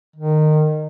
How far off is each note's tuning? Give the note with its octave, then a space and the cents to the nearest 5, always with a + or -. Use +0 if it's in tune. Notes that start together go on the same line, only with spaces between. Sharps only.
D#3 -20